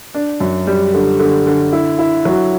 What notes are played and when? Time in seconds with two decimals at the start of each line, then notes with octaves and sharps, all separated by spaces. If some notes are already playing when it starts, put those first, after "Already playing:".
0.15 D4
0.40 F#2
0.67 G3
0.94 D3
1.19 D3
1.47 D3
1.73 E4
1.99 E4
2.25 F#3